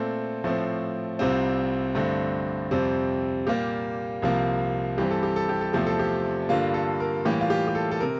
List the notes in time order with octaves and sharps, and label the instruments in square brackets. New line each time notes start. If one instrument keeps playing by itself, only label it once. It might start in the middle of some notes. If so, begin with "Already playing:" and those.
Already playing: [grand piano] A#2 A3 C4 A4
A2 F3 A3 C4
C2 C3 G3 C4 F4
G2 D3 A3 C4
F2 C3 G3 C4
A#2 G3 A#3 G4
C2 C3 F3 A#3
G2 E3 G3 C4 G4
A4
G4
A4
G4
A4
E2 C3 F3 A3 C4 G4
A4
G4
G2 D3 G3 A#3 F4
A4
A#4
A2 E3 G3 A#3 G4
F4
G4
G4
A4
A4
C3 A#4